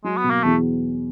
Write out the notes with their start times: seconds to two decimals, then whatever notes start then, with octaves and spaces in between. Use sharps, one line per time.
0.04 F#3 G#3
0.18 B3
0.24 B2
0.30 A#3
0.44 E2 A3